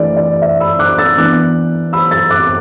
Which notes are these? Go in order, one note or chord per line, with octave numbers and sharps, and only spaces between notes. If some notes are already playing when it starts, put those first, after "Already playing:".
Already playing: E3 A3 D4 D5
D5
E5
B5 E6
D6 F#6
E6 A6
E3 B3 D4 D6 F#6
B5 E6
E6 A6
D6 F#6
D6